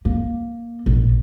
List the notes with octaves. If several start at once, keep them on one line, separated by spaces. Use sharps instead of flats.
A#3
A#1